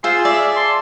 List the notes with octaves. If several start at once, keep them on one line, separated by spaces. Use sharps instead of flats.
F4 G#4 C5 E6
D5 E5
A5 C6